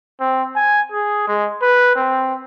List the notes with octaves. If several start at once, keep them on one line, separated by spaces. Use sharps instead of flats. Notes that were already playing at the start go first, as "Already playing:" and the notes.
C4
G#5
G#4
G#3
B4
C4